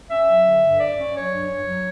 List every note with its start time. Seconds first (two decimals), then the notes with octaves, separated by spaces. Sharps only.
0.10 C#4 E5
0.27 F#3
0.45 D3
0.63 G2
0.79 F#3 D5
0.98 C#4
1.16 F#3 C#5
1.33 G2
1.50 G2
1.67 F#3